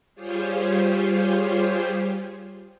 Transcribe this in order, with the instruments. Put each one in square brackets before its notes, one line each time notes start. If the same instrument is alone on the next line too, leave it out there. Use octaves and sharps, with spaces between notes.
[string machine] G3 F4 G4 G#4 C5 C#5